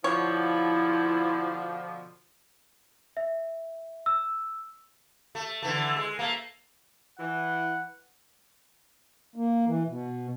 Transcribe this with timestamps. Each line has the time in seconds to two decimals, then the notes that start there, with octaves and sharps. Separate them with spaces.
0.04 B2 D3 F3 E4 C#5
3.17 E5
4.06 E6
5.35 A3
5.62 D3 E3 A3
5.96 G#3
6.19 A3 A#3
7.19 E3 F#5
9.36 A#3
9.66 E3
9.88 B2